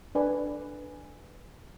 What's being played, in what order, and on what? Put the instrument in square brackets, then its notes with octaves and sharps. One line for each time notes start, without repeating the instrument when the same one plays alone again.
[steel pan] D4 A4 B4 D5 G#5